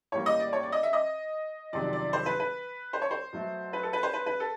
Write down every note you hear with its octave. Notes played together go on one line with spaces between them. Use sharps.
A2 E3 G3 A#3 C#5
D#5
D5
C#5
D5
D#5
E5
D#5
F2 C3 D#3 F#3 D5
D5
C5
B4
B4
C5
C#5
C5
B2 F#3 A3
B4
A4
B4
C5
B4
B4
A4